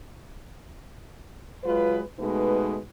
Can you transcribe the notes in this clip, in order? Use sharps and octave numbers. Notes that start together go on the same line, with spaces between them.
F#3 G#3 F4 B4
B2 G#3 A3 D#4 B4